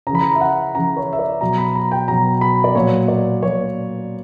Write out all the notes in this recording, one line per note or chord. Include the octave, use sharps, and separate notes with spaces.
C#3 A#5
E3 B5
A#5
E5
F#5
C#3 E3 A#5
C#5
E5
D5
B2 F#3 A#5
B5
A#5
G5
B2 F#3 A#5
B5
D5
A#2 F#3 C#5
D5
A#2 F#3 C#5